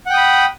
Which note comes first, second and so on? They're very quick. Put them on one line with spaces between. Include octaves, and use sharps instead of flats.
F#5 G5 D#6 B5